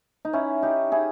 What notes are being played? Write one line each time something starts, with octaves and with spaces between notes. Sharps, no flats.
D#4
C#4 E4
D#4 G4
E4 G#4